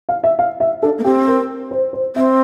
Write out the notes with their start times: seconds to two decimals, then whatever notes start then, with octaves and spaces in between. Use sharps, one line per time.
0.09 F5
0.24 E5
0.39 F5
0.60 E5
0.83 D4 A4
0.98 A#3
1.04 C4 G4
1.27 A#4
1.71 C5
1.93 C5
2.16 C4 E5